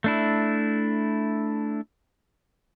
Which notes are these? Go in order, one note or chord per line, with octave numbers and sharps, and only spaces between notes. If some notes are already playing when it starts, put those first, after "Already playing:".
A3 D4 E4